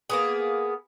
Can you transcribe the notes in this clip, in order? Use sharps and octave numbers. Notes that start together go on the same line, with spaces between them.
A#3 B3 G#4